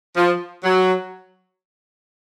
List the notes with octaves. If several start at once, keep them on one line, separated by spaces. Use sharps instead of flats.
F3
F#3